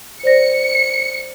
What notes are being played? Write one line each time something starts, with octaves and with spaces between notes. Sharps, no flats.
C5 D5 A#6 C#7